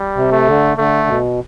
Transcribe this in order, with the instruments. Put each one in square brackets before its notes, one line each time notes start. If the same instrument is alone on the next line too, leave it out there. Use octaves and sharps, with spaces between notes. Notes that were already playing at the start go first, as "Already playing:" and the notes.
Already playing: [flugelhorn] G3
[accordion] C3
[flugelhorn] A3
[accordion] D3
[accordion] D3 [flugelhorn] A3
[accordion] B2